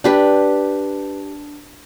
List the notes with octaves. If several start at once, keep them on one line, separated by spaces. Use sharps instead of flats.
D4 G4 B4